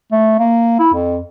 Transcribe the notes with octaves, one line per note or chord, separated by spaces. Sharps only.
A3
A#3
E4
F2